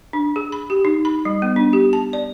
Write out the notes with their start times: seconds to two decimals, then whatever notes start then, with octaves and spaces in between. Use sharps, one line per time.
0.13 D4
0.36 G#4
0.52 B5
0.70 G4
0.85 D#4
1.05 B5
1.25 G3
1.42 B3
1.56 D4
1.73 G4
1.93 A5
2.13 D5